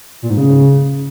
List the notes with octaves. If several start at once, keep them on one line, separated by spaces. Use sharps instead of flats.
A#2
G#2
C#3